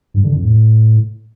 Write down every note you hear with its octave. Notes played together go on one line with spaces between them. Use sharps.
G2
D3
F2
A2